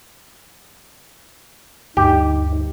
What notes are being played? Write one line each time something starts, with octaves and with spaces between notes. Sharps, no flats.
D2 G2 G3 D#4 G4